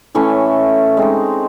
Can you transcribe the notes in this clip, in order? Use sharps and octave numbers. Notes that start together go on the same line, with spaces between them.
A2 E3 A3 C#4
G#3 C4 D#4